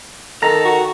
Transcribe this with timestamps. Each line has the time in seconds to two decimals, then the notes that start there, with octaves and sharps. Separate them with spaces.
0.43 D#3 A4 A#5
0.65 F#4